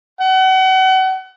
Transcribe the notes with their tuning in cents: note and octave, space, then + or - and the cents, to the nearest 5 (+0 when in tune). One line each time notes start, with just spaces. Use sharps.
F#5 +35